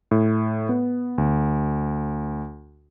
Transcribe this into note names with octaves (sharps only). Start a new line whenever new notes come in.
A2
B3
D2